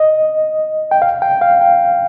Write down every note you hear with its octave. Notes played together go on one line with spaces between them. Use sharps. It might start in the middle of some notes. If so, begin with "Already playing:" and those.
Already playing: D#5
G5
F5
G5
F5
G5